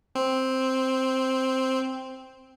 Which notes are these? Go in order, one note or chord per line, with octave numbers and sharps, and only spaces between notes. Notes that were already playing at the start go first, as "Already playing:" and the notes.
C4